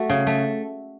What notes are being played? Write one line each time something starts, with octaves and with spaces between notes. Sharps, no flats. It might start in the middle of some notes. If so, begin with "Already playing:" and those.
Already playing: A3 F#4
C#3
A3